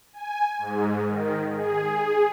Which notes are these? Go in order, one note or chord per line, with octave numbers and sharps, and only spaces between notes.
G#5
G#2
D#3
G#4